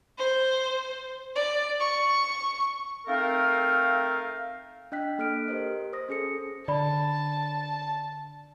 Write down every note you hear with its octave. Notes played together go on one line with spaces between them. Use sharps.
C5
D5
C#6
A3 C4 D#4 A#4 F5
D4 D#5 G5 F#6 B6
A#3 A4 F6 B6 D7
G4 A#4 C5 D#5
C5 D#6 A#6
C#4 G#4 A4 C#7
D3 D5 A5 B5